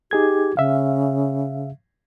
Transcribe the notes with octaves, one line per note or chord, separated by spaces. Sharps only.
D#4 G4 G#4 G#6
C#3 E5 F5